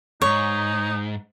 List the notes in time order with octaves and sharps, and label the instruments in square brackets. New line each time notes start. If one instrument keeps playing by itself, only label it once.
[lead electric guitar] E2 G#2 [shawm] D#4 [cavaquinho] C#5